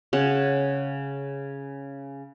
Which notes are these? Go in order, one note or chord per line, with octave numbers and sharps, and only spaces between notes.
C#3 F#5